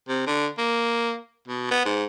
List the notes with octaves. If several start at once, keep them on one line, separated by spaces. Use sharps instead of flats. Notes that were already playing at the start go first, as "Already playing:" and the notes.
C3
D3
A#3
B2
B3
G#2